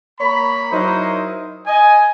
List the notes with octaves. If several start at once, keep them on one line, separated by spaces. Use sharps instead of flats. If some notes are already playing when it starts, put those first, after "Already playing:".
A#3 C#5 A#5 B5
F#3 D#4 E4 A#4 C5 D#5
D#5 G#5